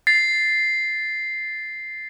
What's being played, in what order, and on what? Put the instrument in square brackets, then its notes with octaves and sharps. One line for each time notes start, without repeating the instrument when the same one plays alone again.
[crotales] A6 C7